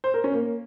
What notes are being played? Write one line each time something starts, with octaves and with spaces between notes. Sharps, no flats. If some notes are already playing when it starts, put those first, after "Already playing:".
C5
A#4
C#4
A#3